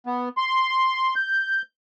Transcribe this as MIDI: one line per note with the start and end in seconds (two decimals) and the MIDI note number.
0.06 0.29 59
0.37 1.14 84
1.16 1.62 91